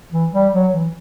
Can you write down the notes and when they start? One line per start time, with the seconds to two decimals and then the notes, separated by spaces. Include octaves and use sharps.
0.12 E3
0.33 G3
0.53 F#3
0.74 E3